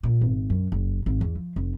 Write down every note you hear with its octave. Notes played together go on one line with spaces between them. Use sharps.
A#2
G#1
F#2
F#1
G#1
E2
F3
F1